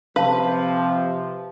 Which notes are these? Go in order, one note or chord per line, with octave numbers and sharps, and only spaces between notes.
C3 F3 B4 F5 A5